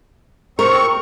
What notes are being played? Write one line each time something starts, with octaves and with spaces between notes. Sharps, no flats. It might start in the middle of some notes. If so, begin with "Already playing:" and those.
C4 A#4 C#6